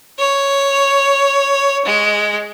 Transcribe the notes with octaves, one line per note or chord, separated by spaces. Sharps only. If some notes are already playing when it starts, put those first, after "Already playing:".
C#5
G#3